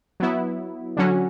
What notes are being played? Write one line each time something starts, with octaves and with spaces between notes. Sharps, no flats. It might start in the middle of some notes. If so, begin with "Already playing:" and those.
F#3 B3 E4
D3 F#3 C#4 F#4